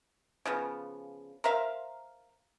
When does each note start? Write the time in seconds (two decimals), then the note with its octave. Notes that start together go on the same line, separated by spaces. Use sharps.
0.46 C#3 F3 B3
1.44 A#4 C5 E5 F5